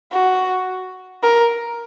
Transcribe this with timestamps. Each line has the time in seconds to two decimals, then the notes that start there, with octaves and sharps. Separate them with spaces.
0.12 F#4
1.23 A#4